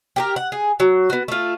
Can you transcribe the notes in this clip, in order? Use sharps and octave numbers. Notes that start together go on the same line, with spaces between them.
G4 G#4 A#4
F#5
G#4
F#3
B3 F#4
A3 F4